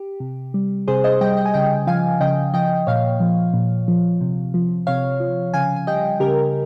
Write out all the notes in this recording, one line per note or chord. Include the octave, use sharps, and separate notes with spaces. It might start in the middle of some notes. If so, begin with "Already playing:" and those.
Already playing: G4
C3
G3
C3 G#4 C5
C5 D#5
G3 D#5 G5
D#5 G5
G#5
C#3 D#5 G5
F3 F5 G#5
C#3 D#5 G5
F3 D#5 G5
A#2 C#5 F5
F3
A#2
F3
C3
F3
C3 C#5 F5
F3
C#3 F5 G#5
G#5
G3 D#5 G5
C#3 G4 A#4